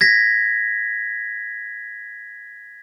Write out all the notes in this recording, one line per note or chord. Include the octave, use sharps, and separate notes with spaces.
G#6 A#6 B6